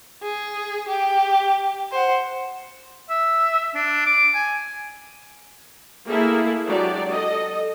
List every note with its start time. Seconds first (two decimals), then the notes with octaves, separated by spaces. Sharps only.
0.22 G#4
0.88 G4
1.91 C5 F#5
3.10 E5
3.75 D4
4.06 D6
4.34 G#5
6.08 A3 A#3 E4 G#4 A4 E5
6.66 F#3 G#3 D4 G4 D5
7.09 A4 D#5